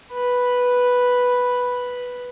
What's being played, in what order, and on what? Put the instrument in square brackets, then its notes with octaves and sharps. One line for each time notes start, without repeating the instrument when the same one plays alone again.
[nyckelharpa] B4 B5